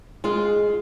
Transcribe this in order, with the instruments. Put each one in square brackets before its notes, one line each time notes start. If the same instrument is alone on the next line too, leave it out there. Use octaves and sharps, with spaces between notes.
[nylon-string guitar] G#3 F4